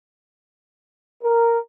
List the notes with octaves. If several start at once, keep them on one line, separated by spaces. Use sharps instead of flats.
A#4